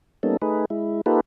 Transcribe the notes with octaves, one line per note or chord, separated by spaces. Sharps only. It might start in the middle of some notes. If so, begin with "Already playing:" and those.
G3 A#3 B3 C#4 D#4 A4
A3 D#4 G#4 B4
G#3 E4
A#3 D#4 F4 G4 A4 B4